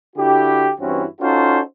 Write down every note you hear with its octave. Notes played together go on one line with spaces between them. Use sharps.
D3 E4 F#4 G4
G2 E3 C4 C#4 E4 F#4
C#4 D#4 F4 F#4 A4 C5